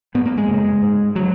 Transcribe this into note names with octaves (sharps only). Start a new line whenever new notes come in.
G#2 B3
A#3
G#3
F#2 C#3
G#2
D3 F#3